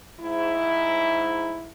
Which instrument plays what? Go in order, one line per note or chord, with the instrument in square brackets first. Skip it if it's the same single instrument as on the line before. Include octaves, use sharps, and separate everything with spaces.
[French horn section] G#2 E4